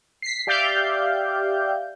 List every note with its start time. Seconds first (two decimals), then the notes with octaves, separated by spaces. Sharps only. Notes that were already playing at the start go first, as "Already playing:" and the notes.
0.22 B6 C7
0.47 G4 D5 E5 F5 G6